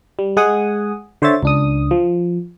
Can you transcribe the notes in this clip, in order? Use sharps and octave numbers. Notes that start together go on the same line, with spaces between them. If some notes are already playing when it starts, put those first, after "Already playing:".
G3
G#3 G#4 F#5 G#5 D#6
D3 C5 C#5 E5 A6
C#2 D4 D#6
F3